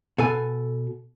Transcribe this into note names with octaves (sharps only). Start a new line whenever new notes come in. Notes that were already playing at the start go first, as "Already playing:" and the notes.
B2 A4 G#5